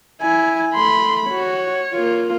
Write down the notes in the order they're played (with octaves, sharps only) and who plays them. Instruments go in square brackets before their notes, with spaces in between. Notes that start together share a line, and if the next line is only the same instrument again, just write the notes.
[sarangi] E4 [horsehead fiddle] G#5
[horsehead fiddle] A3 B5 [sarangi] C6
[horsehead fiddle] F#4 [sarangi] C#5
[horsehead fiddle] A#3 F4